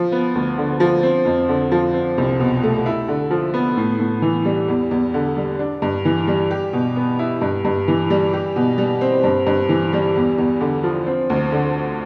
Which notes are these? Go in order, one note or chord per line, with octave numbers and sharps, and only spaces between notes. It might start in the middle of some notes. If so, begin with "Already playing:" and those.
Already playing: F3
B3
D2
D3
F3
C4
F2
D3
F3
C4
C2
B2
A3
E4
D3
F3
B3
A2
A2
E3
G3
E2
E2
D3
G3
D4
G2
E3
G3
G4
B2
B3
E4
G2
G2
E3
G3
G4
B2
G3
C4
G2
G2
E3
G3
E2
E2
D3
F3
C4
D2
D3